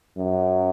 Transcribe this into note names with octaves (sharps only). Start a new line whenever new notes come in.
F#2